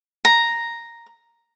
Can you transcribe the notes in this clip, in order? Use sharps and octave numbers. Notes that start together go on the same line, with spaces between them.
A#5